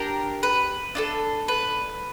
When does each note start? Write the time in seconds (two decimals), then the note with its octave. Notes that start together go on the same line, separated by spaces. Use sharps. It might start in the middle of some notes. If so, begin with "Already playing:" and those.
Already playing: D4 G4 A#4
0.43 B4
0.95 D4 F4 A4
1.48 B4